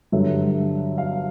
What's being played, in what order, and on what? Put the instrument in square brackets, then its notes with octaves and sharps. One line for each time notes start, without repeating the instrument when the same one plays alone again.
[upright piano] G2 D3 F#3 E5
F5